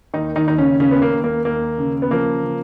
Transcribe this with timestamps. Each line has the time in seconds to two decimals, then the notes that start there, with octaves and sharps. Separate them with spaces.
0.14 D#2 D#3 D#4
0.36 D#3 D#4
0.47 D#2 D#4
0.58 C#3 C#4
0.80 D#2 C#3 C#4
0.91 B3
1.02 A#3
1.12 D#2
1.24 A#3
1.45 D#2 A#3
1.78 C#3
2.02 B3
2.11 F3 A#3
2.44 C#3